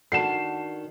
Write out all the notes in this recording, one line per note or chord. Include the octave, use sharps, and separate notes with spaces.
D#3 D4 F#4 A4 F#5 A5 C7 E7